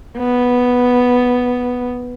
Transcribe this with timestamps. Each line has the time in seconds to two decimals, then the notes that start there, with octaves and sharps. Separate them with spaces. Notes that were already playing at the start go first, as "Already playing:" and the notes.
0.18 B3